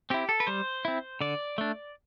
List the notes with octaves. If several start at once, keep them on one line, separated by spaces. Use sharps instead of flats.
C4 E4 G4
A4
B4
G3 C5
C4 E4
D3 D5
A3 D4